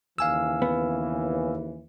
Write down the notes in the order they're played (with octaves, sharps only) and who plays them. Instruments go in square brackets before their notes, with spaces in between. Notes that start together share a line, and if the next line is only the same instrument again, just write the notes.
[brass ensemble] D#2 C#3 E3 [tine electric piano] F5 G#5 E6
[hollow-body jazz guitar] B3